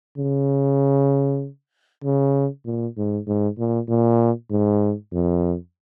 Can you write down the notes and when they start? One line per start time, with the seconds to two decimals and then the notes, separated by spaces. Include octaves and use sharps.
0.18 C#3
2.04 C#3
2.65 A#2
2.97 G#2
3.27 G#2
3.58 A#2
3.88 A#2
4.51 G#2
5.12 F2